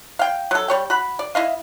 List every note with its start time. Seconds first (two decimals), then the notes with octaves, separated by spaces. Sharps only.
0.19 F5 G5
0.51 F#3 A4
0.68 G3 C#5 G5
0.90 F#4 B5
1.19 D5
1.35 E4 D#5 F5